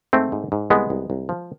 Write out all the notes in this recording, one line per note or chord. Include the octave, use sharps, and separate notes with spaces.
G#2 A3 C4
G#2
G#2
C2 G#3 B3
C2
C2
F3